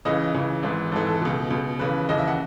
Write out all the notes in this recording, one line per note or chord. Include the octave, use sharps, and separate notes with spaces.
C#2 C#3 E3 D#5
C#2 C#3 E3
G#1 G#2 E3
G#1 G#2 E3 A4
A4
C#2 B2
C#2 B2
D#2 C#3 E3 B4
D#2 C#3 E3 D#5
E5
F#5